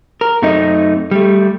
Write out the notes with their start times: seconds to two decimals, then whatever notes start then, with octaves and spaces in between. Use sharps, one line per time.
0.21 A#4
0.42 F#2 A3 C4 D#4 D#5
1.11 G3 A3